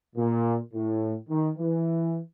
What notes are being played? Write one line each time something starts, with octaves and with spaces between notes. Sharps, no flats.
A#2
A2
D#3
E3